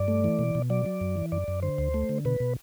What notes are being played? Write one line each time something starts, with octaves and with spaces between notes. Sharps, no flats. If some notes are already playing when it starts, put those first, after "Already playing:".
Already playing: G2 D5
A3
E3
B2
B2
F#3 D5
F#3
F#2
E3
F#2 D5
F#2
D3 C5
D2
A3
D3
B2 B4
B2